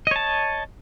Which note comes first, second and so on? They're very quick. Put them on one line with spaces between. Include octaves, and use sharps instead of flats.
D#5 C#5 A5